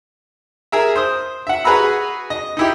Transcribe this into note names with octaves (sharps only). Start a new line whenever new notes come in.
G#4 A#4 E5
C5 D#6
E5 F#5
F#4 G#4 B4 A#5 B5 E6
D#5
D#4 E4 G4